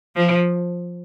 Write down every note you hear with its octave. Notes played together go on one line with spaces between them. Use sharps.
F3